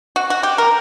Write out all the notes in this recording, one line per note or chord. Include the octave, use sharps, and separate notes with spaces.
F#4
F#4
G4
A#4